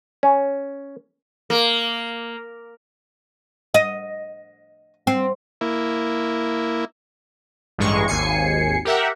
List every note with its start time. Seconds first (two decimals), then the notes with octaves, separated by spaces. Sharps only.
0.23 C#4
1.50 A#3
3.74 D#5
5.07 C4
5.61 A#3 E4
7.78 A1 G2 G#3 C#6
8.08 G#1 D#2 G#5 C7 C#7
8.85 G4 A#4 E5 F#5